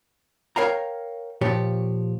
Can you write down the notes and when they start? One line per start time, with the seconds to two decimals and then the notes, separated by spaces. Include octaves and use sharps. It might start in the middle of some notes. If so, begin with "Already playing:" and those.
0.56 A#4 C#5 F5 G5 A#5
1.41 A#2 F3 G4 C#5